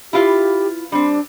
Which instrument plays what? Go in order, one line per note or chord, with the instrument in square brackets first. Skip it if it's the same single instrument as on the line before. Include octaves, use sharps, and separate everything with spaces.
[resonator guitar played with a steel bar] E4 F4 B4 [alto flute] G4
[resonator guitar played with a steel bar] G3 C4 [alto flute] D4